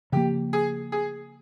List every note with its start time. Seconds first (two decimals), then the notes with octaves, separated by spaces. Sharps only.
0.12 C#3 F3 A#3 G4
0.53 G#4
0.92 G#4